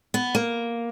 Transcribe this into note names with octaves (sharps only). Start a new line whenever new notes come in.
B3
A#3